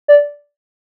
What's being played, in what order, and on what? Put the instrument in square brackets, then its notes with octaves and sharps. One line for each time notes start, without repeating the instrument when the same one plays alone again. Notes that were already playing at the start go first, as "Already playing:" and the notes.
[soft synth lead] D5